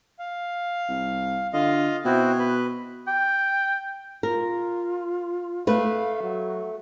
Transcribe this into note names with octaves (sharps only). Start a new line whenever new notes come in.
F5
C2
D3 F4 D#5 F5
B2 C4 E4 F#4
B4
G5
F4 A#4
A3 B4 F5
F#3